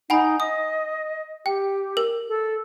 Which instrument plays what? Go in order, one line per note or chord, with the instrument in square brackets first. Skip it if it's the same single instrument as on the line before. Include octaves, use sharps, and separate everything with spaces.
[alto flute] D#4 [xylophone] F#5 G#5 B5
[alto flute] D#5 [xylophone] D#6
[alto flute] G4 [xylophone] G5
[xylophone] A#4
[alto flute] A4